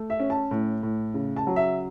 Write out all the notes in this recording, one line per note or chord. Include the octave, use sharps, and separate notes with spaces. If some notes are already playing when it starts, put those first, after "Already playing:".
Already playing: A3
E5
C#4
A5
A2
A2
C#3
A5
F#3
E5